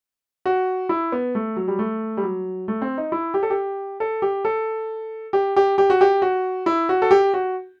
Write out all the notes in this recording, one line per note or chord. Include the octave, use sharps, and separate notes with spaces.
F#4
E4
B3
A3
F#3
G3
A3
G3
F#3
A3
C4
D#4
E4
G4
A4
G4
A4
G4
A4
G4
G4
G4
F#4
G4
F#4
E4
F#4
A4
G4
F#4